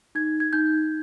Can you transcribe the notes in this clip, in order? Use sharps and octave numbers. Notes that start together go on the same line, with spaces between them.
D#4 G#6
G#6
D#4 G6